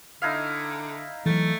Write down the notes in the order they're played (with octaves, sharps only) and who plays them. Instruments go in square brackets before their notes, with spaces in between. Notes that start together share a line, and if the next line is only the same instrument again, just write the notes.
[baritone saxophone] D3 [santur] D#4 E4 F5
[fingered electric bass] E3 F#3 [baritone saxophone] A3